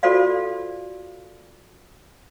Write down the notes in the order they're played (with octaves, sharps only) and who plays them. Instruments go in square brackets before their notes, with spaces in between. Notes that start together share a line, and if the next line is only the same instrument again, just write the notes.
[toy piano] F4 F#4 A4 C5 D5 F5